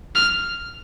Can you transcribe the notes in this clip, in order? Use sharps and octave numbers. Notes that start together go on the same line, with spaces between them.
F6